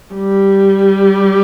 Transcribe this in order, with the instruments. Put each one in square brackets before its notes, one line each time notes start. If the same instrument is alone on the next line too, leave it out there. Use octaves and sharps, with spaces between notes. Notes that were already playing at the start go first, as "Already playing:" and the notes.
[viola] G3